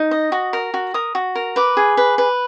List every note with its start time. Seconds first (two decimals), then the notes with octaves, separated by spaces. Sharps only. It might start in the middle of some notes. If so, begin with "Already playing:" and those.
Already playing: D#4
0.11 D#5
0.32 F#4
0.53 A#4
0.74 F#4
0.94 A#4 D#6
1.15 F#4
1.35 A#4
1.56 B4 D6
1.77 G#4
1.97 B4
2.18 B4